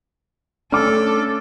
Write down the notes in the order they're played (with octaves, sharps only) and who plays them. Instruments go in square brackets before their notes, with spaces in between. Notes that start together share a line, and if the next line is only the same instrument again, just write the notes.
[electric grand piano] A3 C#4 [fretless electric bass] D4 [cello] A4 [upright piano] D6 F6